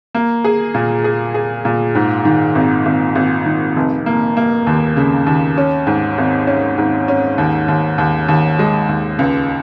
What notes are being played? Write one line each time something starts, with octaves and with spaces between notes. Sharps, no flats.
A#3
G#4
A#2
G#4
G#4
A#2
G#2
D#3
G#1
G#1
G#1
D#3
F1
A#3
A#3
D#2
C#3
D#2
C#4
G#2
G#1
C#4
G#2
C#4
D#2
D#2
D#2
D#2
G#3
D#2
C#2